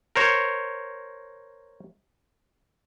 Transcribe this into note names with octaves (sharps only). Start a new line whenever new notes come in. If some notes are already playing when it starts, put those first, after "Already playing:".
A#4 C5 C#5